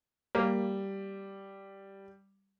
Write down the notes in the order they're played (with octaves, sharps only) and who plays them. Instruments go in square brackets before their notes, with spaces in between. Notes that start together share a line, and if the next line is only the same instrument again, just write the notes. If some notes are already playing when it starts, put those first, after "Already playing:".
[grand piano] G3 [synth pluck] A#3